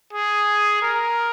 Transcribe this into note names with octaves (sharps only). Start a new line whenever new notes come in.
G#4
A#4